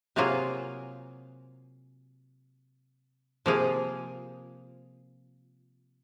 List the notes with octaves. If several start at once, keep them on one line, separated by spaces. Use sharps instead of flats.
C3 F#3 A#3 F4 G#4
C3 F3 A#3 F4 G#4